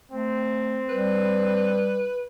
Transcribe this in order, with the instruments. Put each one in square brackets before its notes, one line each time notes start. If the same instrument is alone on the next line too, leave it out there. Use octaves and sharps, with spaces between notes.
[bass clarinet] A3 [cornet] C4
[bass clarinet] G3 [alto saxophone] B4